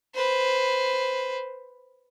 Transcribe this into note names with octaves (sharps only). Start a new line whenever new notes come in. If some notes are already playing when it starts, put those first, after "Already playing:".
B4 C5